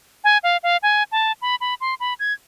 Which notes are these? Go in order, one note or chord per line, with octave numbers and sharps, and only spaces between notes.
G#5
F5
F5
G#5
A5
B5
B5
C6
B5
G#6